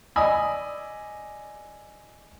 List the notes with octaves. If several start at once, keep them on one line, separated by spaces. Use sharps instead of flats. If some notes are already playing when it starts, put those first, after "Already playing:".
D5 D#5 G#5 B5 D#6 E6